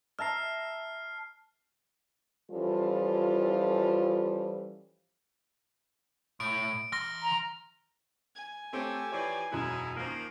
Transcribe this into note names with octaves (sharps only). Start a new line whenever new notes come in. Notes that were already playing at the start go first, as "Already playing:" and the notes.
E5 A5 A#5 F6 C7
E3 F3 G3 C#4 F4 A4
A2 D7
E3 C6 F6 A#6
A#5
G#5
A3 C4 G4 A4 C#5
E3 F3 G4 C#5 D5
E1 F#2 G#3 D#4 E4 F#6
D#3 F3 A#3